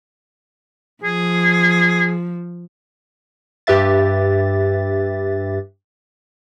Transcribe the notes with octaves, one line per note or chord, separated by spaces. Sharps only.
F3 G#4
G2 G4 B4 E5 A6